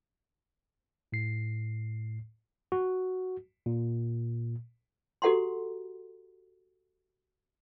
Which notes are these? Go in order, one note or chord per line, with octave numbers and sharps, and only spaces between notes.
A2 C7
F#4
A#2
F#4 G4 A4 F#5 A#5 C6